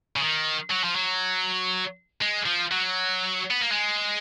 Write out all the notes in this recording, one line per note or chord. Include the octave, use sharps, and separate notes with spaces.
C#3
D#3
F#3
F3
F#3
G#3
F3
F#3
B3
A#3
G#3